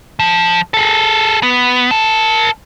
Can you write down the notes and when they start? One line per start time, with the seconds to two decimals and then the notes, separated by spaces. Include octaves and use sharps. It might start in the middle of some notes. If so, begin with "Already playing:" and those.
0.19 F3
0.74 G#4 A4
1.43 B3
1.91 A#4 A5